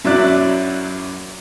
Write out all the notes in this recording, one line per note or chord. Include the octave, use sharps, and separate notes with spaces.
F#2 F#3 E4 D5 F#6